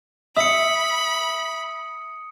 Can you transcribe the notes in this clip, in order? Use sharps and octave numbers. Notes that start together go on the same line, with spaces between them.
E5 B5 D#6 C#7